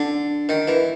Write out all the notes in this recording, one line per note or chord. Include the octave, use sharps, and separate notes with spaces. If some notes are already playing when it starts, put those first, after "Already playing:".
Already playing: D3
D#3
E3